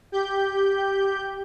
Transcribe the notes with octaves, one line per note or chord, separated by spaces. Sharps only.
G4 G6